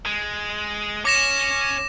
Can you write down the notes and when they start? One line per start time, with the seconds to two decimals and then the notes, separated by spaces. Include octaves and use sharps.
0.06 G#3
1.05 C#4 C#5 D6 A#6 E7